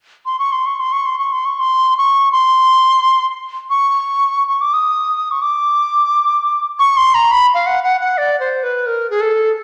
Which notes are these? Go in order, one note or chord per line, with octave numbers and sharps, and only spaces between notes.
C6
C#6
C6
C#6
C6
C#6
C6
C#6
C6
C#6
C6
C#6
C6
C#6
C#6
D6
D#6
C#6
D6
C#6
C6
A#5
B5
F5
F#5
F#5
F#5
D5
C5
B4
A#4
G#4
A4